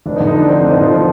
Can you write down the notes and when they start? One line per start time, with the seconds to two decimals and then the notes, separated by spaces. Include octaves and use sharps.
0.06 F1 D4
0.16 D#4
0.20 D3
0.27 D#4
0.34 F3 D4
0.48 F2 C4
0.59 D4
0.63 F1
0.71 D#4
0.77 D3 F4
0.92 F3